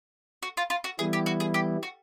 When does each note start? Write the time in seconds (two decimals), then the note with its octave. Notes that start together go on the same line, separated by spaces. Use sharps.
0.43 F#4
0.57 F4
0.70 F4
0.84 F#4
0.99 E3 G3 B3 E4 G#4
1.13 G4
1.26 F#4
1.40 G#4
1.54 G4
1.83 F#4